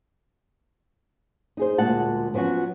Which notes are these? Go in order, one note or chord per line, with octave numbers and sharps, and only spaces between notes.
D#4 G#4 C5
D2 A#2 G#3 F#5 A5
F3 F#3 B3 C#4 F#4